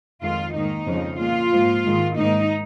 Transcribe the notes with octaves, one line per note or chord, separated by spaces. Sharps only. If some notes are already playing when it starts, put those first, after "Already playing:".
F2 D#3 G#3 F4
G#2 D#3 A#3 D#4
F2 C#3 F3
A#2 G#3 F4
G#2 F3 A#3
G#2 D#3 G#3
G#2 D#3 A#3 D#4